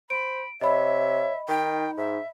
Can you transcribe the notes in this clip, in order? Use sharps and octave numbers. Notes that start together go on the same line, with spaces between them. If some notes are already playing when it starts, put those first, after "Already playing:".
C5 B5 D7
C3 C#5 D#5 E5 B5
D#3 D#4 G5
G#2 E5